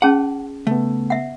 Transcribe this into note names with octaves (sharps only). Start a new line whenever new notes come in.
C#4 G#4 F#5 A5
C#3 A3 B3
E5 F#5